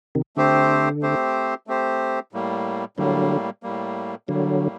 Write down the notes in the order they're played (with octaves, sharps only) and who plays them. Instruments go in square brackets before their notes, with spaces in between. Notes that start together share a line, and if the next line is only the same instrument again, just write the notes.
[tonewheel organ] C3 D#3
[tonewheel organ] D3 [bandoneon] A3 C4 G4 C5
[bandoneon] A3 C4 G4 C5
A3 C4 G4 C5
A2 G3 A#3
[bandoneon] A2 G3 A#3 [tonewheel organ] D3 F#3
[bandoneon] A2 G3 A#3
[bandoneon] A2 G3 A#3 [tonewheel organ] D3 F#3